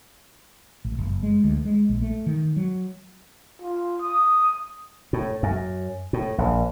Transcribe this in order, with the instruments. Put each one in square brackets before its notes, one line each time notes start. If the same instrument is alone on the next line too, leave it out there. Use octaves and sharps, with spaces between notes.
[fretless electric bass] A1
F#1
G#3
D2
G#3
A#1
A3
D#3
F#3
[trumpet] F4
D#6
[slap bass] A2
F#2
A2
A#1